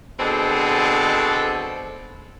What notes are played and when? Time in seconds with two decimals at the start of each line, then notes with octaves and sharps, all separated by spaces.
0.20 B2 D3 G#3 C4 A4